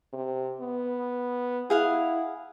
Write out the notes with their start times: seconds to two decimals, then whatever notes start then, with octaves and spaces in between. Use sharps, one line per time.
0.13 C3
0.60 B3
1.70 E4 G#4 F5 F#5